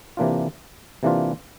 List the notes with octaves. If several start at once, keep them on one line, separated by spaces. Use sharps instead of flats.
C3 E3 A#3 D4 F4
C3 E3 A#3 D4 F4